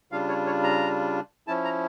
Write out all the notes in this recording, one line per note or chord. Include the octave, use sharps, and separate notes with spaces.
C#3 G3 D4 F4 F5
C#5
C#5
A#5
F3 C#4 E4 A5
A#5